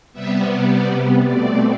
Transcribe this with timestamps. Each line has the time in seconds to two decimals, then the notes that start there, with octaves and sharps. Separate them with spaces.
0.13 C3 G3 B3 E5
0.69 D5
1.24 B2 A3 C4 D5